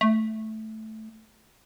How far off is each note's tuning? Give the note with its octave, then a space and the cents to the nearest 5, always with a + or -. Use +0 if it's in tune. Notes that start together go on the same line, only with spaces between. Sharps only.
A3 -5